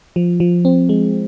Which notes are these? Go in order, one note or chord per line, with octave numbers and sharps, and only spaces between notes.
F3
F3
C4
G#3